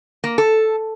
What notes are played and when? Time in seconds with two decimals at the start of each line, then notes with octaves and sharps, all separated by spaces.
0.24 A#3
0.38 A4